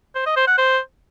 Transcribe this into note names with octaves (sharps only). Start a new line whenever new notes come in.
C5
D#5
C5
F#5
C5